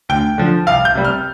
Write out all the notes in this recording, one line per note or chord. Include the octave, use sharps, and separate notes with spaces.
D2 G5
D3 F3
C2 F5
G6
C3 G3
F6